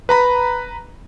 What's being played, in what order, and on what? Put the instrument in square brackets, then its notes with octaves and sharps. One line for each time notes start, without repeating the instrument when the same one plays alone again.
[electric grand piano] B4 A#5 B5